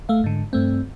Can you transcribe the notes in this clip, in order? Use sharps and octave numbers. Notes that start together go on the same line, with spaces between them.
A3 F5
G#2 D3
G2 A3 C4